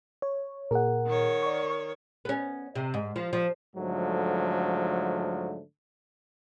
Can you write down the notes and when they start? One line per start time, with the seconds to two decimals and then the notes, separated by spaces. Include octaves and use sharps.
0.22 C#5
0.71 A#2 G#4 A#4 F#5
1.06 D#3 C#5
1.43 D5 C#6
2.25 B3 C#4
2.75 C3
2.94 G#2
3.16 F3
3.33 F3
3.76 G#2 D3 F3 F#3 A3